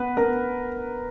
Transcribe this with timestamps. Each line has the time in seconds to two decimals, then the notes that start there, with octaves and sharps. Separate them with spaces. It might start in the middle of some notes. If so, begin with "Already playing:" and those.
Already playing: B3 B4
0.17 B3 A#4